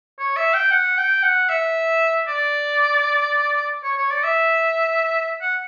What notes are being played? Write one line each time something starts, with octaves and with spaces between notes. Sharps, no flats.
C#5
E5
G5
F#5
G5
F#5
E5
D5
C#5
C#5
D5
E5
F#5